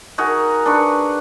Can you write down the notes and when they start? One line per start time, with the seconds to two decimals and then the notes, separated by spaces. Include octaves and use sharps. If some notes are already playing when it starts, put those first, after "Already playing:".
0.18 D#4 F#4 G#4 A#4
0.66 D4 B4 C#6